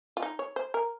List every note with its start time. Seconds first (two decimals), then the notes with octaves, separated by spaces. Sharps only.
0.17 F4
0.22 D#4
0.39 C#5
0.56 C5
0.74 A#4